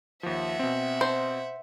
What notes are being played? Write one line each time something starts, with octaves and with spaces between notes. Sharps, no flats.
D#2 F3 E5 F#5
B2 C4
C5